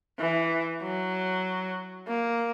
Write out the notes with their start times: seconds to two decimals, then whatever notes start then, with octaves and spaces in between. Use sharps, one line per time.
0.19 E3
0.82 F#3
2.08 A#3